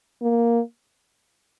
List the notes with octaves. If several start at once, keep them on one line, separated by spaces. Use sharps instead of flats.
A#3